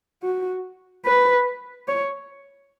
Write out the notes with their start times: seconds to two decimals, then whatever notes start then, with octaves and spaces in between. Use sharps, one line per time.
0.23 F#4
1.05 B4
1.88 C#5